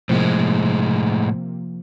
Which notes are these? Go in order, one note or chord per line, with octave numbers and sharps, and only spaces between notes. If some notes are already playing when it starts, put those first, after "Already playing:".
A2 C3 F3 G#3 A#3